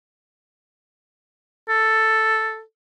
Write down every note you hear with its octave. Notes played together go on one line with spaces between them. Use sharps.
A4